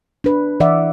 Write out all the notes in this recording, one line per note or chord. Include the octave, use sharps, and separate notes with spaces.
D4 B4
E3 D5 E5 F#5